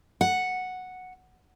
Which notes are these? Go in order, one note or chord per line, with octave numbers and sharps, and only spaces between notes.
F#5